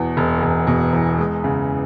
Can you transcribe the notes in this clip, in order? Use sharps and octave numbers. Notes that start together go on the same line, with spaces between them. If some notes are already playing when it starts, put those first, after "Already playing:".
Already playing: E2 B2
E1
E1
B2
E2
G#3
C#3